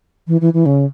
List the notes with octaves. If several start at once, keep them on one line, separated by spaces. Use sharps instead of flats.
E3
E3
E3
C#3